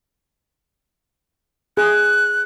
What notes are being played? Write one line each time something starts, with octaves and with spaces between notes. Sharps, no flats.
G#4 F#6